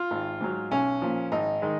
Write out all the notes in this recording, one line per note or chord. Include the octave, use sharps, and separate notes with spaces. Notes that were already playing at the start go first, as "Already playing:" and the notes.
Already playing: F4
G#1
G#2 F#3
B1 C#4
A#2 F3
G#1 D#4
D#3 G#3